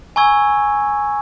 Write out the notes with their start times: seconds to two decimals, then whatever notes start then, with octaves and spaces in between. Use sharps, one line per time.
0.16 G#5 A#5 C#6 E6 G#6